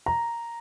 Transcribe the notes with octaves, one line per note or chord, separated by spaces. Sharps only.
A#5